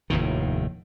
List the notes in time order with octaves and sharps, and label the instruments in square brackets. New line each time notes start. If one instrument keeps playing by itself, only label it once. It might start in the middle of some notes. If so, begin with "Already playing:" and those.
[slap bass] F1 D#2 A2 D#3